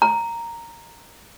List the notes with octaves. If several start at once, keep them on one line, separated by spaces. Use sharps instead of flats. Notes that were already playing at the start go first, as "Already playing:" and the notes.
A#5